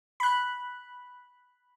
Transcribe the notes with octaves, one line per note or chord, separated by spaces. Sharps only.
B5 F#6